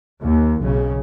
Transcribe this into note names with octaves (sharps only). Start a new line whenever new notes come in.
D#2
B1 C#3